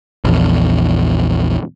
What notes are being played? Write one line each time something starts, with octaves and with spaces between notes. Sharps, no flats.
A#1 E2